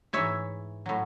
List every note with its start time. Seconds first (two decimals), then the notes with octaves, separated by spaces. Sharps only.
0.13 G#2 E3 C#5 E5
0.86 A2 F#3